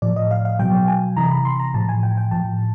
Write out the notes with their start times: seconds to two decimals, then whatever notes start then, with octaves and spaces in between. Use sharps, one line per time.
0.02 A2 F3 D5
0.16 D#5
0.31 F5
0.45 F5
0.59 B2 F#3 G5
0.88 G#5
1.17 C3 E3 A#5
1.31 B5
1.45 C6
1.60 A#5
1.74 A2 F3 A5
1.89 G#5
2.03 G5
2.17 G5
2.31 A2 F3 A5